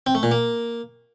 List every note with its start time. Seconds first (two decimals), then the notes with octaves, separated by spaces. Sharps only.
0.07 C4
0.15 A3
0.23 A#2
0.31 A#3